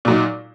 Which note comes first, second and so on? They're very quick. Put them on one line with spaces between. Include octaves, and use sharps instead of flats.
A#2 F#3 D#4